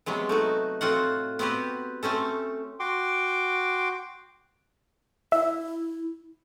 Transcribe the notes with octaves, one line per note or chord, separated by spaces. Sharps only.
C3 F#3 G#3 B3
A3 D#4 F#4
A2 C4 F4 F#4 F#5
B3 C4 F#4 G4 B4
A3 C4 C#4 A4
F#4 G5 C6 D6
E4 E5